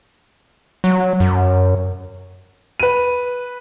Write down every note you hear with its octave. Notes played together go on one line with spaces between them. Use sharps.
F#3
F#2
B4 D#7